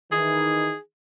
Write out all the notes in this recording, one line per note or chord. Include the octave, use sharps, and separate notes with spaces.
D#3 E3 D#4 G#4